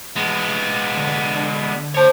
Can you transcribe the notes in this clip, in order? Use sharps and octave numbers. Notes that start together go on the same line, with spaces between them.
G#3 B3
D3
C5 C#5 A5